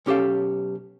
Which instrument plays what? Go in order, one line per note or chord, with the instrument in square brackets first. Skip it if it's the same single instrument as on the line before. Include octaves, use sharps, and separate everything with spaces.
[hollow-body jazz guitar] B1 C#4 G4 A4 F5